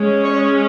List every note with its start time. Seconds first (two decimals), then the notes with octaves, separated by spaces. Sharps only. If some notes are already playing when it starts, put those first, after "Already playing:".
Already playing: G#3 C#4
0.23 C#5